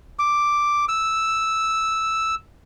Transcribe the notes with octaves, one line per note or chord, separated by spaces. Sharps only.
D6
E6